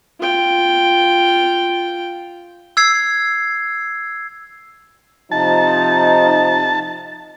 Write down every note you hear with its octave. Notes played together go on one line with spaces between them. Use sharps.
F4 G5
E6 G#6 C7
C3 F3 D#4 A5